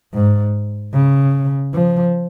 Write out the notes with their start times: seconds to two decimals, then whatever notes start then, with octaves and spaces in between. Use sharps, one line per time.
0.14 G#2
0.94 C#3
1.74 F3